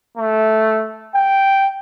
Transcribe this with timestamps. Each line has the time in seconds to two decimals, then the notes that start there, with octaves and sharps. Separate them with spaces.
0.17 A3
1.15 G5